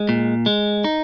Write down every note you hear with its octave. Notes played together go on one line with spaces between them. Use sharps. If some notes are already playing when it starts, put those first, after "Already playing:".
Already playing: G#3
A#2
G#3
D#4